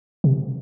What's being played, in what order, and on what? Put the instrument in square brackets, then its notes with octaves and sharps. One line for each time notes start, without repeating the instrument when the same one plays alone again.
[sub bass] C3